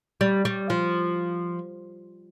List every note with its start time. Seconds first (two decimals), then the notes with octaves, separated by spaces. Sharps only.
0.21 G3
0.45 G3
0.70 F3